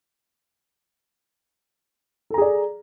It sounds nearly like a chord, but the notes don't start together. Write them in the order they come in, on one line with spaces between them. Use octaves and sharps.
A4 A#5 G#4 D5